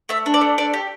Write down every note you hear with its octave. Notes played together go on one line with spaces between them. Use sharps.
A3 E5
D4
D5
A3
D4 D5
G4